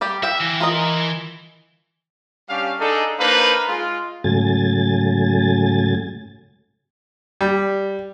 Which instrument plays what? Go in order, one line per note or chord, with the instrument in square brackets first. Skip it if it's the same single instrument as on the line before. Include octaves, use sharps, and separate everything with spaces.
[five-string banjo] G3 G4 D5
[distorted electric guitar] E5 [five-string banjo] F5 G5
[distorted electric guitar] E3
[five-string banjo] F4 A#4 D#5
[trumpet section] G3 C#4 D4 G4 F5
D4 D#4 G#4 A4
A#3 D4 D#4 B4 C5 F5
G#3 F4
[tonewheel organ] G#2 C#3 F#3 A3 G#5 A6
[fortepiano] G3